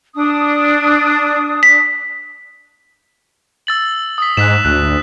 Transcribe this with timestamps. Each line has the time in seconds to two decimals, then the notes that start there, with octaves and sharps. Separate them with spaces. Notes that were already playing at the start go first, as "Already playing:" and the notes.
0.15 D4 D#6
1.63 B6
3.67 E6 A6 F#7
4.18 D#6 B6
4.37 G#2 F#6 B6 E7
4.65 D2 F#6